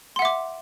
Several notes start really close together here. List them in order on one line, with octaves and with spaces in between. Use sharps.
C6 F#5 E5 D6